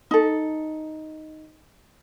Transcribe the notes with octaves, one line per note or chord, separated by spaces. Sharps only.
D#4 A4